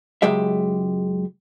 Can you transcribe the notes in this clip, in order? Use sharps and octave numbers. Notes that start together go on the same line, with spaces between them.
C#2 F#2 G#3 G4 E5